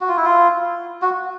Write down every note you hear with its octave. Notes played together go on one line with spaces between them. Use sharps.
F#4
F4
E4
F4
F#4